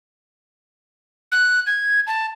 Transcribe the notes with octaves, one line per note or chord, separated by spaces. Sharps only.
F#6
G#6
A5